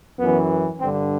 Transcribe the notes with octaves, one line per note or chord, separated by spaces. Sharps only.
F#2 E3 B3
G2 D3 C4